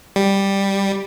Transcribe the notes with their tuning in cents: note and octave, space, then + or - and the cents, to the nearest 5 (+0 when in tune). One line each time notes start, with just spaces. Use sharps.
G3 +5